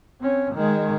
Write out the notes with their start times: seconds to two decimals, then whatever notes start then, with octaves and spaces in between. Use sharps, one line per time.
0.21 C4 C#4
0.54 D#3 G#3